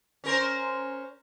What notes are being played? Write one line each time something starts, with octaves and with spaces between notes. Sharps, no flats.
C#4 A#4 C5